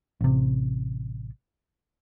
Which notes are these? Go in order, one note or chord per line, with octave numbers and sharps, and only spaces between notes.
A1 C3